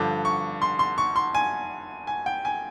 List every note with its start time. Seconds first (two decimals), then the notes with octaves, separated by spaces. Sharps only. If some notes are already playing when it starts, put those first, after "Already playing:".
Already playing: G2 D3 F3 D6
0.25 C#6
0.62 C6
0.79 C6
0.98 C#6
1.16 C6
1.35 G#5
2.07 G#5
2.26 G5
2.45 G#5